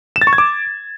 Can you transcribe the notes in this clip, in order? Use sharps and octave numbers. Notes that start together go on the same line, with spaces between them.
E7
A6
C#6
G#6
D6